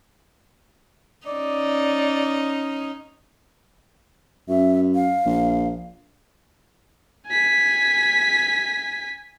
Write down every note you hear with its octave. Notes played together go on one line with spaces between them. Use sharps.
C#4 D#4 D5
F#2 E5
F5
A#1
G#5 B6